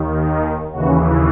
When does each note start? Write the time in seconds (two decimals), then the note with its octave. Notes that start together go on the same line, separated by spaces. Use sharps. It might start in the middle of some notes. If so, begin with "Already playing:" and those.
Already playing: D#2 D#3
0.26 D#4
0.73 D#2 C#3 E3 F#4